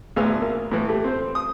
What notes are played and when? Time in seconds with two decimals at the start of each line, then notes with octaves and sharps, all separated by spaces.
0.16 A1 D2 B3 G#4 F5 E6
0.42 A#3
0.72 A2 E3
0.88 A3 G4
1.04 C4 C5
1.35 D#6